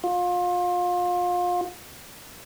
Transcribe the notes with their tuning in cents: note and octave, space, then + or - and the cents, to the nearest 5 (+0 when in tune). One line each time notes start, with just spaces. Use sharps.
F4 +30